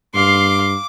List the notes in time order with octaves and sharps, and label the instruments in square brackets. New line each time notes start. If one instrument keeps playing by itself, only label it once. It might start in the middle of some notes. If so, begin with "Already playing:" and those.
[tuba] G2 [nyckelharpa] F5 C6 [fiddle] D6